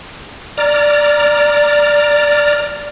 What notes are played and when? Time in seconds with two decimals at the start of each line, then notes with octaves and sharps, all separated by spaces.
0.58 D5 A#5 F6